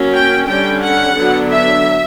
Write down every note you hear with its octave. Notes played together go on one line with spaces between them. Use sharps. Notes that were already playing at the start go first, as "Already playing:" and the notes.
Already playing: F#3 A#3 C#4
G5
D3 G3 C#4 G5
F#5
D3 F#3 B3 D4
E5